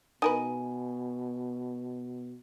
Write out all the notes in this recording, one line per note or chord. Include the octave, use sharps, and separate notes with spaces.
B2 D#4 A#4 B4 G#5